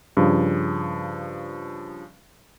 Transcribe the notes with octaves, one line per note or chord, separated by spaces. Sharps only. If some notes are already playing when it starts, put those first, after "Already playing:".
G2 C#3 F3